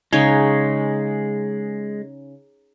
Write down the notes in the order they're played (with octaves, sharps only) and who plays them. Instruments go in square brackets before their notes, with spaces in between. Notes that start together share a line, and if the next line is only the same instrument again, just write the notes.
[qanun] C#3 D#4 C#5 [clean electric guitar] G#3